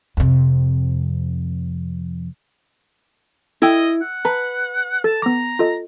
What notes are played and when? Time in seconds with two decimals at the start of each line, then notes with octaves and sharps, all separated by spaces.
0.17 F2 C3
3.62 E4 A4 D#5 G5
4.02 F#5
4.25 B4 A5 A#5
5.04 A4 A5
5.22 B3 A#5 D6
5.59 F4 A4 D#5